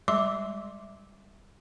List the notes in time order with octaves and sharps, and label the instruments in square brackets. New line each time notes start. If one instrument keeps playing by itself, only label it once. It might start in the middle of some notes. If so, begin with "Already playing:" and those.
[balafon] G3 G#3 E5 C6 D6